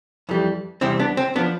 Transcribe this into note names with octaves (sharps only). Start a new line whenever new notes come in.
F2 E3 G3
E2 C3 G3 C4 E4
B3 D4
C4
F3 B3 D4